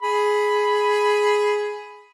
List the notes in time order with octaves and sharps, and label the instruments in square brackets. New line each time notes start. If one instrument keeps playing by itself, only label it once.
[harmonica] G#4 B5